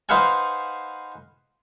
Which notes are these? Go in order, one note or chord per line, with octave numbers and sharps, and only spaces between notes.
D#4 B4 C5 F5 F#5 G#5